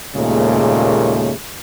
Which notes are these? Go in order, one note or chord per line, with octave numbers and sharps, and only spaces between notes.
D#2 A#2 C#3 G#3 A3